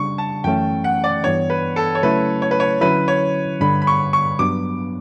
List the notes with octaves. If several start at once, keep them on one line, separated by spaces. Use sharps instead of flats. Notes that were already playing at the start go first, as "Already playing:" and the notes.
Already playing: C#3 G3 D4 C#6
A5
F#2 E3 A3 C#4 G5
F#5
D5
G2 E3 B3 D4 C#5
B4
A4
C#5
C#3 F#3 A3 C#4 E4 B4
C#5
B4
C#5
D3 F#3 C#4 E4 B4
C#5
G2 D3 G3 B5
B5
C#6
C#6
G2 F#3 B3 D4 D6